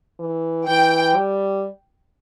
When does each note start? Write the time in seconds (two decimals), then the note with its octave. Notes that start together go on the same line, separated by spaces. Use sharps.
0.20 E3
0.68 E3 G5
1.17 G3